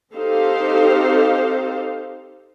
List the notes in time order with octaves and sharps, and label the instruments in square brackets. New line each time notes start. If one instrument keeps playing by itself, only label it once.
[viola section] C4 D#4 G4 A4 C5 F5